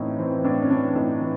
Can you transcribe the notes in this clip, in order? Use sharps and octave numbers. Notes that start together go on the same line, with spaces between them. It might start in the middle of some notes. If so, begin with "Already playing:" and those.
Already playing: A2 E3 C4 C#4 D#4 E4
E3 C4
A2 D4
C#4
E3 D4
A2 D#4
E3